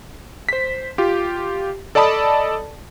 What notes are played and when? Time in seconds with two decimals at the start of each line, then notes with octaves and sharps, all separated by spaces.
0.49 C5 B6
0.98 F4 G4
1.95 A4 D5 D#5 A5 B5 D#6